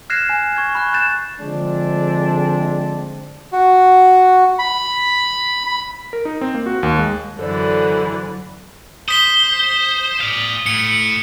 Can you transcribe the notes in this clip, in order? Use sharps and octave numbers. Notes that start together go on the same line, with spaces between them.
F6 F#6 G#6 A#6 C7 E7
G#5
C#6 G#6
B5 C#6 F#6
F#6 G6 A6 E7
D3 F3 G#3 C4 D4
F#4
B5
B5
A#4
D#4
C4
A#3
F#4
D#2
G#3
F#2 D3 E3 A4 C5 D5
C5 D#6 B6 G7
D5 F5
A2 C#7